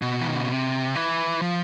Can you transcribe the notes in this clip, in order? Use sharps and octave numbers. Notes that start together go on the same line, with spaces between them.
B2
E3
D#3
D3
C#3
C3
E3
F3